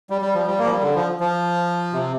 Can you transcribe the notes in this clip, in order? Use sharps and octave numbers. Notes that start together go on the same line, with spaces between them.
G3
G3
F3
G3
A#3
F3
G3
D3
F3
F3
C3